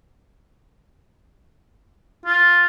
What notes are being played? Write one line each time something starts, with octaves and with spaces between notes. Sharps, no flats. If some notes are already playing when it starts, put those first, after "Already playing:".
F4